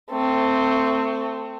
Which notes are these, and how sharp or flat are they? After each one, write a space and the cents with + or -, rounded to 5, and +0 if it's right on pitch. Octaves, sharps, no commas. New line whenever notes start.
A3 +20 C4 -5